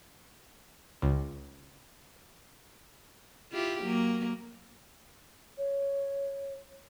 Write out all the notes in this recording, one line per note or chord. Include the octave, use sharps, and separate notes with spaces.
C#2
E4 F4 G4
F#3 A#3
C#5